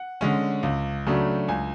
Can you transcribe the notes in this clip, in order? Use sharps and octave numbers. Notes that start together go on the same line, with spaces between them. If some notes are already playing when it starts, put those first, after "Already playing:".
Already playing: F#5
D3 G#3 C#4
C#2
C#3 F#3 A3 D4
C#2 G#5